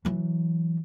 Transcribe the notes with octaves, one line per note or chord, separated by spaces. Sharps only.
E3 F#3